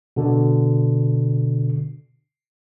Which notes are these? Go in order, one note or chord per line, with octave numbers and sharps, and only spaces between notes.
B2 D3